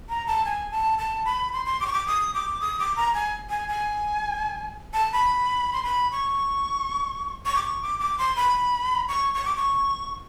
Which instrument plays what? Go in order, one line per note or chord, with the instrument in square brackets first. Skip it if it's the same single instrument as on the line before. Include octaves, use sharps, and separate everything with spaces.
[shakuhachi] A#5
A5
G#5
A5
A5
B5
C6
C6
D6
C#6
D6
D#6
D6
D#6
D6
A#5
G#5
G#5
G#5
A5
B5
C6
B5
C#6
C#6
D6
C#6
D6
D6
C6
B5
C#6
C#6
D6
C#6